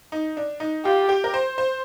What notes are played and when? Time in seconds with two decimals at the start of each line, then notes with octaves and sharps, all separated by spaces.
0.12 D#4
0.37 D4
0.60 D#4
0.85 F4 G4
1.09 G4
1.24 A#4
1.34 C5
1.58 C5